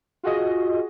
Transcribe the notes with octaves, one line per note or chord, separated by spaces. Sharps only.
F4 F#4 G#4 D#5